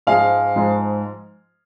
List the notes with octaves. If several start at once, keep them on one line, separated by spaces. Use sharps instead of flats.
G#2 F3 G#3 F5
G#2 F3 G#3